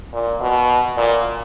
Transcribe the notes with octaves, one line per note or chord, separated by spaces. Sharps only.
A#2
B2
A#2